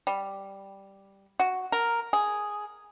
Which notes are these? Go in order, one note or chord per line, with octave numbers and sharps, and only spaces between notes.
G3
F#4
A#4
G#4